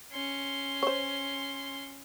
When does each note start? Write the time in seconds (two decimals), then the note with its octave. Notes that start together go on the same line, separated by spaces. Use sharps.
0.12 C#4 C6
0.83 C5 C#5